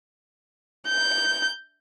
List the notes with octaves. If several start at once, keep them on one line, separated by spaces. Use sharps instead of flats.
G6